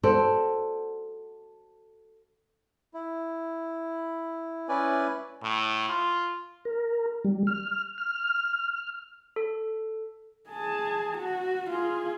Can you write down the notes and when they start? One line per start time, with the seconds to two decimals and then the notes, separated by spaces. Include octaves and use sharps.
0.03 F#4 A4 C5 D5
2.94 E4
4.69 C#4 E4 B4 D5 G#5
5.43 A2
5.89 F4
6.65 A#4
7.25 G3
7.47 F6
7.98 F6
9.36 A4
10.49 G#4 A5
11.18 F#4
11.70 F4 G#4